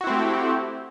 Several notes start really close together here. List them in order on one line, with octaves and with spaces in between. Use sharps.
F#4 E4 C4 A3 G4